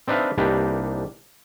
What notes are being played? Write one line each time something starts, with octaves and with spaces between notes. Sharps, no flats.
C4 D4 D#4 B4 E5 F5
C2 A#3 D4 D#4 G4 B4